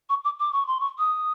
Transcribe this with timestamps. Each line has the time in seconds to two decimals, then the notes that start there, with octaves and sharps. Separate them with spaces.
0.09 C#6
0.24 D6
0.39 D6
0.53 C#6
0.67 C6
0.80 C#6
0.99 D#6